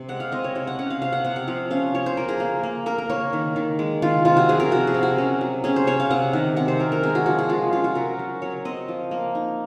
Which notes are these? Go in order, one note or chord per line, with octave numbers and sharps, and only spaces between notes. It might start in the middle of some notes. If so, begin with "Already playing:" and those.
Already playing: C3
G#3 F#5
F5
C4 D#5
C#5
C3 C#5
F#5
C#4 F#5
F5
C3 F5
F#5
C3 F#5
F#5
F3 F5
C#4 F5
F3 C#5
C5
A#3 A#4
G#4
A#3
A#3
A#3 A#4
A#4
A#3 C#5
D#3
D#3
G#3
D#3 F4
C3 F4
F#4
F3 G#4
A#4
C3 F#4
G#4
C3
F#4
C#4
F#3
C#4 G#4
C5
C#4 C#5
F5
C3 F#5
D#3 F#5
C3 F#5
C5
F#3 A#4
A#4
G#3 G#4
F#4
F3 F#4
G#4
G#3 F4
C#4 F4
F#4
F#3 A#4
F#3
F#3 C#5
C4 D#5
F3
A#3
D#4